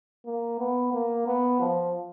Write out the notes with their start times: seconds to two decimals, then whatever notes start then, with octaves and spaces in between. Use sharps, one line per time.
0.26 A#3
0.60 B3
0.93 A#3
1.27 B3
1.60 F3